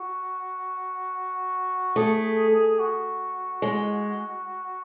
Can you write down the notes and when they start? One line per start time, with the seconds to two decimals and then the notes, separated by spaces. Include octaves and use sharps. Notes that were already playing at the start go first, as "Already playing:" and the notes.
Already playing: F#4
1.96 A3 G#4
2.79 F#4
3.62 G#3